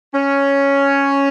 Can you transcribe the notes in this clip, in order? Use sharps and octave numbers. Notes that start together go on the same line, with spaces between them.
C#4